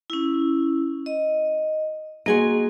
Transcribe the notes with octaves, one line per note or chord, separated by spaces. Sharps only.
C#4 E4
D#5
A#3 F#4 G#4 D#5 G#5 C6